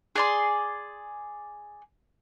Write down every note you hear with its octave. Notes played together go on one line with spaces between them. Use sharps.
G#4 D5 C6